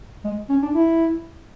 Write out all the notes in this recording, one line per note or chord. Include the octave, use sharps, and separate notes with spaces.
G#3
C#4
D4
E4